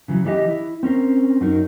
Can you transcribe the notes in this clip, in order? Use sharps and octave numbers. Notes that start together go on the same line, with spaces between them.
C#3 E3 F#3
E3 G3 D#4 G4 D#5
E4
C4 C#4 A#4 C5
F#2 F#3 D#4 A#4